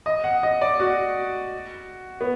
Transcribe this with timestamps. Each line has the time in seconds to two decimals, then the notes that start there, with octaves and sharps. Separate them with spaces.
0.06 D#5
0.24 F#5
0.43 D#5
0.61 D5
0.80 F#4
2.21 B3